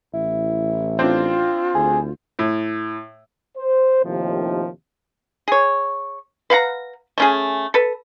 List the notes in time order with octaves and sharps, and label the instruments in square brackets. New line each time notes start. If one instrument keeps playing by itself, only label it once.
[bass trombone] A1 [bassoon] E4
[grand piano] C4 D4 [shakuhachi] F4
[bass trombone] D2 [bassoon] G#4
[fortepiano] A2
[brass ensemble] C5
D#2 A2 C3 D#3 F3
[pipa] G#4 C#5
B4 F5 F#5 A#5
A3 C#4 G#4
A4 B4